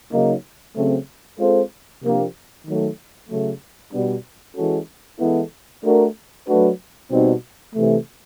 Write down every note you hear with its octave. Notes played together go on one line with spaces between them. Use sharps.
C#3 F#3 A#3 D#4
C#3 F#3 A3 C4
G#3 C4 F4 A4 C5
C3 F3 A#3 D4 G4
D#3 F#3 A3
C#3 F#3 A3
B2 G3 B3 D4
E3 G#3 C#4 F#4 A4
E3 G#3 B3 E4 A4
A3 D4 F#4 A#4
F#3 A3 D4 F#4 B4
B2 G3 C4 D#4
C3 E3 A3